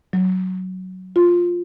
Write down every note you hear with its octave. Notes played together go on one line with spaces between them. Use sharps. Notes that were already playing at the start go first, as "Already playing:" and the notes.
F#3
F4